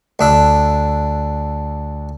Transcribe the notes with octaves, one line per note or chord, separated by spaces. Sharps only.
D2 D4 E5